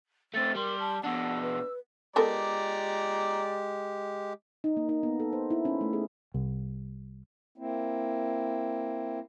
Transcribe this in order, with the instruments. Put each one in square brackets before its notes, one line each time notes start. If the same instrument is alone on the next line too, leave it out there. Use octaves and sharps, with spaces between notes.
[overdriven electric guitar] A3 C4 [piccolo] A6
[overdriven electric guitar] G3 [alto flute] A#4 [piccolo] C6
[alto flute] A5
[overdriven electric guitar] B2 D4 [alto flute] F#5 [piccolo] E6
[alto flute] B4
[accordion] G#3 G4 [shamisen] B3 A4 A#4 [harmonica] D5 A#5
[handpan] D#4
A#3
D#4
B3
A4
C5
E4
C#4
A3
G#4
[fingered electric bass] C2
[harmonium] A#3 C4 E4